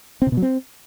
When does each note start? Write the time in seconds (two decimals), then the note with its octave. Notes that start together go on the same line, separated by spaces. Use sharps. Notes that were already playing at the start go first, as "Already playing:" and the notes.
0.22 C4
0.27 C3
0.32 B2
0.37 F#3
0.42 C4